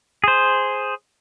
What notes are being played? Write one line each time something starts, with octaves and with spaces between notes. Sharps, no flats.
G#4 C5